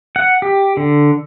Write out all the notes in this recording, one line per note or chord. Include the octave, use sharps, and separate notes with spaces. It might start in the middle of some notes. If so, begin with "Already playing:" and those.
F#5
G4
D3